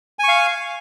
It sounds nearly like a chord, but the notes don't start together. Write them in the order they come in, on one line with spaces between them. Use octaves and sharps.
G#5 C#6 F5